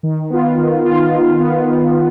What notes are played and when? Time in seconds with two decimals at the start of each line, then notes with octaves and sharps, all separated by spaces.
0.03 D#3
0.30 B3 F4
0.57 D#3
0.85 B3 F4
1.12 D#3
1.40 B3 F4
1.67 D#3